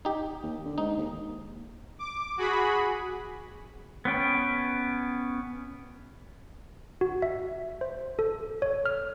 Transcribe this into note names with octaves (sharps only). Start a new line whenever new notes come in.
D#4 G4
D#2
D3
G#2 D#4
D#2
D6
F#4 G#4 B5
B3 C#4 G5
F#4
E5
C5
A4
C#5
F6